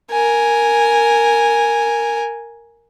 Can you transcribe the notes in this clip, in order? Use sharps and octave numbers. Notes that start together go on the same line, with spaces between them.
A#4 G#5